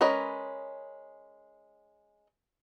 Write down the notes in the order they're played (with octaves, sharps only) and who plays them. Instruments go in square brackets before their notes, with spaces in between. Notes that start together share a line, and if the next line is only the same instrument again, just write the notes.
[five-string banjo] G#3 C#4 A#4 B4 D#5